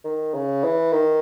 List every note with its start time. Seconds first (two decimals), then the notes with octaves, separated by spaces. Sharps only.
0.04 D#3
0.34 C#3
0.64 E3
0.92 D#3